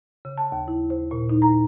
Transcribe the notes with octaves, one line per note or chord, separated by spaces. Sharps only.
C#3
A5
D#2
E4
C5
A#2
D#4
A#5